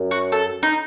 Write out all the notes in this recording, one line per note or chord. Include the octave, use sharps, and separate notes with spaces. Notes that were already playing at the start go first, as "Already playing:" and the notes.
Already playing: F#2
F#4
A4
D#4